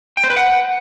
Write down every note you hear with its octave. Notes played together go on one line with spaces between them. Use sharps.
G5
C5
B4
F#5